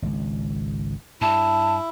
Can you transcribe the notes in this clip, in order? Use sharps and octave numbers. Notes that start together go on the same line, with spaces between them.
G#1 C#2
G2 E4 A5